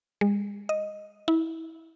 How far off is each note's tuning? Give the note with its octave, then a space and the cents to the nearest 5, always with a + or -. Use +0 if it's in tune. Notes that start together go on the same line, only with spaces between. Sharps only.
G#3 -35
D#5 +0
E4 -25